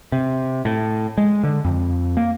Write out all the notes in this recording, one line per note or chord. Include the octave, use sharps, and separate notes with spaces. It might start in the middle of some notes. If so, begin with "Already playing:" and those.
C3
A2
G#3
D3
F2
A#3